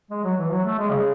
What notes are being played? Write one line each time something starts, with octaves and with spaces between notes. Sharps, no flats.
G#3
F#3
E3
F#3
A3
G#3
C#3